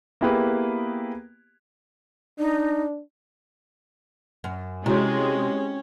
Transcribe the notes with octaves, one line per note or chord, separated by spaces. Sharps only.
A#3 B3 E4 G4 G#4 B4
D4 D#4
F#2
C3 G#3 C#4 E4 F#4 C#5